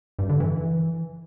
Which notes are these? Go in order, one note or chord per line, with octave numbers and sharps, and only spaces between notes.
G2
D3
E3